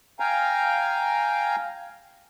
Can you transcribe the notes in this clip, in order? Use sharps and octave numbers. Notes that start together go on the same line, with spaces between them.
F5 G5 G#5 A#5